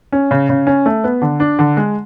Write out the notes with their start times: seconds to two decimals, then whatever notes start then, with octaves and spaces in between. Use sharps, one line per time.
0.12 C#4
0.31 C#3
0.49 C#3
0.67 C#4
0.86 A3
1.04 B3
1.22 D3
1.40 D4
1.59 D3
1.77 G#3